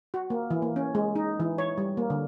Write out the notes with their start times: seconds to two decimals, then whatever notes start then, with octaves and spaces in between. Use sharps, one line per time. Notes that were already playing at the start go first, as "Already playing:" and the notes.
0.14 F#4
0.30 A#3
0.50 E3
0.62 A#3
0.76 C#4
0.95 G#3
1.16 D#4
1.40 E3
1.58 C#5
1.78 G3
1.97 A#3
2.10 D3